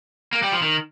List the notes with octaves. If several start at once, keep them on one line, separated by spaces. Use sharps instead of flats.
A#3
G3
F3
D#3